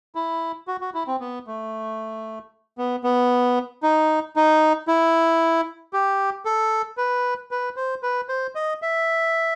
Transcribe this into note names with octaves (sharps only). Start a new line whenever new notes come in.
E4
F#4
F#4
E4
C4
B3
A3
B3
B3
D#4
D#4
E4
G4
A4
B4
B4
C5
B4
C5
D#5
E5